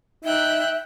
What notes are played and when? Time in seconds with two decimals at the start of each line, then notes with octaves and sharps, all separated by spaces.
0.24 D#4 E5 G5 E6 F#6